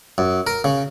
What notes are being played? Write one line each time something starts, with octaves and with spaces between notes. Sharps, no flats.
F#2
A#4
C#3